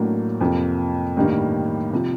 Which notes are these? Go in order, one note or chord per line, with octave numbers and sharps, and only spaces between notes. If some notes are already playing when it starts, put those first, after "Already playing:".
Already playing: A1 A2 F#3 A#3 D4
F2 C3 F3 A#3
A1 G2 D#3 G3 A#3
C3 F3